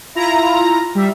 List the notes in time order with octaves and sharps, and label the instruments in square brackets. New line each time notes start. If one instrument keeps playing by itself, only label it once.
[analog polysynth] E4 F4 A#5
G3 E5